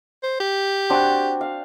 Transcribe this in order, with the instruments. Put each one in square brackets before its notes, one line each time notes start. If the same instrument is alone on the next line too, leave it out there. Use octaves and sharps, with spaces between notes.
[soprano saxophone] C5
G4
[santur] C4 D4 F#4
F5